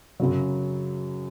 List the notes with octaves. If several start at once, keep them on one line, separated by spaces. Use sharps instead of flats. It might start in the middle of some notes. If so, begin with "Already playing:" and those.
F#2 C#3 F#3